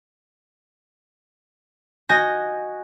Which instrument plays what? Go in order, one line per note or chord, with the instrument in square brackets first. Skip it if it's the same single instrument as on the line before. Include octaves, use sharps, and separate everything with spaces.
[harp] F#4 D#5 G#5 G6 A#6